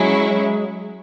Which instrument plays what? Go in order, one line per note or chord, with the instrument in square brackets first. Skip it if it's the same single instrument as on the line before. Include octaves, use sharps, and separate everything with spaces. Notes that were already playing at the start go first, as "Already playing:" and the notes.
Already playing: [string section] F#3 C#4 E4 [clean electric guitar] G#3